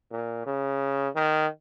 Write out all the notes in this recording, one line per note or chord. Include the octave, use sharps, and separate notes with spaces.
A#2
C#3
D#3